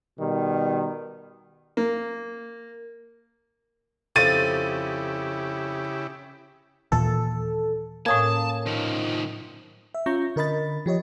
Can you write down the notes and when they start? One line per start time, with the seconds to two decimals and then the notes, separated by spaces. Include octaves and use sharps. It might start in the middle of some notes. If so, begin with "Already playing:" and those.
0.18 B2 D#3 G3
1.77 A#3
4.16 F2 C#3 E4 G4 A6 D#7
6.92 D#2 A#2 E3 A4
8.06 A2 A#3 C#4 A5 D#6 G#6
8.66 D#3 F3
9.95 E5
10.06 C#4 F4 A#5 C#6 G6 A#6
10.36 D3 A#4 D#5 B5 A6
10.86 F3 G4 C#5 D#5